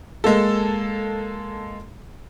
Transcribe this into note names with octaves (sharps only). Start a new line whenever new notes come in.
G#3 A#3 A4